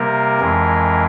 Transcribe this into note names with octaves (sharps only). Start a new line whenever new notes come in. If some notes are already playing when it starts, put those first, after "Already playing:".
Already playing: C3 G3 A#3 A#4
F2 E3 G#3